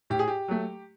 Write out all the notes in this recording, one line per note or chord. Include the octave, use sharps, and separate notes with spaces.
A2 G4
G#4
G4
F#3 A3